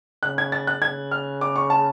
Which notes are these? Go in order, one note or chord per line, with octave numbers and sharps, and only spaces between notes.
C#3 F#6
G#6
A6
F#6
C#3 G#6
F6
D6
C#6
A5